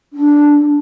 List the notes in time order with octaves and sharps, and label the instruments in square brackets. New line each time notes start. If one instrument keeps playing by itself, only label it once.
[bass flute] D4